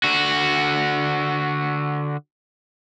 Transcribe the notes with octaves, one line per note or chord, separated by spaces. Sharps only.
D3 F#4